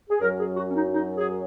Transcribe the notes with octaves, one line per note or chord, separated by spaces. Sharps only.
G#4
F#2 F#3 A#4
G#4
F#4
C#4
D#4
D#4
G#4